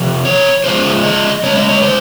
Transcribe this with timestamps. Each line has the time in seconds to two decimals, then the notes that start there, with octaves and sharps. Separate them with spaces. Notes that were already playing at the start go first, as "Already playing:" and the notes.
Already playing: C3 F3
0.25 C#5
0.64 C#3 F3 G#3 C5
1.03 D#5
1.43 C#3 G#3 C#5
1.56 D#5
1.69 C#5
1.83 C5